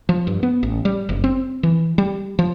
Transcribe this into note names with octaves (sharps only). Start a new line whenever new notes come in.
F3
G2
B3
A1
G3
F#1
C4
E3
G3
F3